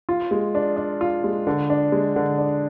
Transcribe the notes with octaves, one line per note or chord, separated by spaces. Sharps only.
F4
G#3
D4
D4
F4
G#3
D3
D4
G#3
D3
D4